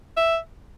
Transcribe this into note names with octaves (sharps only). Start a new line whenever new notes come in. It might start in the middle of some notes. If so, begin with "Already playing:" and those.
E5